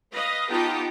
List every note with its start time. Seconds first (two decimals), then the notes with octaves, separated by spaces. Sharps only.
0.13 B4 D#5 F5
0.49 B3 D#4 F4 G4 G5 A5